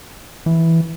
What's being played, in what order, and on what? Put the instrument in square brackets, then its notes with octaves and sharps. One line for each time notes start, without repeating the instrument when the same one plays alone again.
[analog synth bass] E3